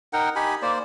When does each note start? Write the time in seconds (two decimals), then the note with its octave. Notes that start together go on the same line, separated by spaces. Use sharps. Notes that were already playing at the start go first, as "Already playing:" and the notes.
0.13 D#4 A#4 F#5 G5
0.36 D#4 G4 G#5 B5
0.62 A#3 C5 D5